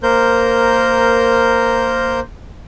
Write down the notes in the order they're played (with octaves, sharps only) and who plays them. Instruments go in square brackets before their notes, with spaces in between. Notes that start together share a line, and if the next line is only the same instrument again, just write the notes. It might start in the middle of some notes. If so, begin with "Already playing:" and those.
[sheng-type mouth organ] A#3 A#4 C5 G6